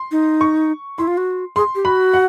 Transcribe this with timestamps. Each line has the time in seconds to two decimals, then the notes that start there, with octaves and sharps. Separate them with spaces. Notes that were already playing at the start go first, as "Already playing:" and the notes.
Already playing: C6
0.11 D#4
0.41 C#6
0.98 E4 C6
1.07 F4
1.17 F#4
1.56 G#4 C6
1.75 G4
1.85 F#4 B5
2.14 F#5